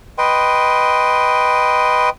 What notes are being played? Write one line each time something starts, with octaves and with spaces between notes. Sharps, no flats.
B4 D#5 G5 C6